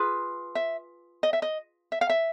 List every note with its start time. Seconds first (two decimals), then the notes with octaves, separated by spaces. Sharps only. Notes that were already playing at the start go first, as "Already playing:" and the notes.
Already playing: F4 G#4 B4
0.55 E5
1.23 D#5
1.33 E5
1.42 D#5
1.92 E5
2.01 F5
2.09 E5